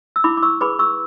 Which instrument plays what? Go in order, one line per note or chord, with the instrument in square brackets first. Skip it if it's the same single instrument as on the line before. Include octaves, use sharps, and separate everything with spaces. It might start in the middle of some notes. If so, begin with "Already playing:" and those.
[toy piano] E6
E4 B5 D6
D6
C#6 E6
G#4 B4 B5 D6
C#6 E6